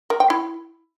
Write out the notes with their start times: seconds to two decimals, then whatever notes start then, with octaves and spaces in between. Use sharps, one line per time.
0.10 A#4
0.20 G5
0.30 E4